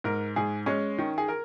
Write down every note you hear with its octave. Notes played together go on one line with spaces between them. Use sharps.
G#2 A#4
G#2 G#4
G#3 C#4
D#3
G#4
A#4